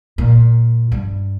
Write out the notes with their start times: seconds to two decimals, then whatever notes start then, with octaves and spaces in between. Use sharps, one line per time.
0.18 A#2
0.92 G2